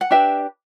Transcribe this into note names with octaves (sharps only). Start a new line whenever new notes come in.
F#5
D4 G4 B4 E5